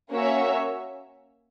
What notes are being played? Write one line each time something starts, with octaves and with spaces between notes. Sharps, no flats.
A#3 C#4 F#4 C#5 E5